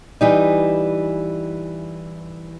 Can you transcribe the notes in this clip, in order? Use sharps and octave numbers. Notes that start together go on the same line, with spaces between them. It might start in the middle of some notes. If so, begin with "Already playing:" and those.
E3 G3 D#4